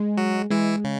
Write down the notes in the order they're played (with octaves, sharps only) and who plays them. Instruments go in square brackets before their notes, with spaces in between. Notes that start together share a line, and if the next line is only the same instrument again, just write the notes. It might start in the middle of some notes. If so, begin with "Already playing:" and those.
Already playing: [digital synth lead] G#3
[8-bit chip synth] F#3 F#4
[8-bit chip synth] E3 E4 [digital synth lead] G#3
[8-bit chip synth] C#3